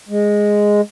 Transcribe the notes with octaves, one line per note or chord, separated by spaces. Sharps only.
G#3